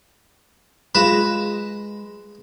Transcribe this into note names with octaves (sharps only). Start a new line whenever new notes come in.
G#3 F4 B4 A#6 E7